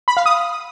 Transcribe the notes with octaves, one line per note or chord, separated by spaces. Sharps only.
B5
F5
D#6